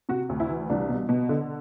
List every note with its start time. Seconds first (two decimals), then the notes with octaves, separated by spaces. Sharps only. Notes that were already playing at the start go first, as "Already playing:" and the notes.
0.09 C3 F#4
0.29 D2
0.40 E4
0.49 E3
0.70 C2 D4
0.89 B2
1.09 B2
1.29 D3